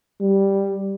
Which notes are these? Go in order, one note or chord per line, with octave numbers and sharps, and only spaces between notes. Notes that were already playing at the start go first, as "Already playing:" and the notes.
G3